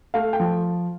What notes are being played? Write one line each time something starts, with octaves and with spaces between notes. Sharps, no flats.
A3 F5
G5
F3